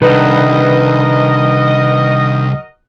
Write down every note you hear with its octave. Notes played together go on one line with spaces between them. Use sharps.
C2 D#3 D4 F#4 A#4 B4 D#5